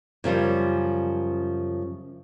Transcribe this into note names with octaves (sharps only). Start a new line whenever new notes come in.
F#2 C#3 F3 G3